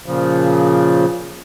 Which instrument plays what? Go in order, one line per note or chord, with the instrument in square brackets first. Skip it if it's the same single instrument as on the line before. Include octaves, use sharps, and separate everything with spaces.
[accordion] A#2 C#3 F3